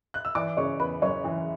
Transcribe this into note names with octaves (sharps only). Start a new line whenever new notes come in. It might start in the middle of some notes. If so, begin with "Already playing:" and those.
F#6
E6
E3 D5 D6
C#3 C#5 C#6
E2 B4 B5
F#1 C#5 C#6
E3